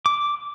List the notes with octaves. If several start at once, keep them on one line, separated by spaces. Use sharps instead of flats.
D6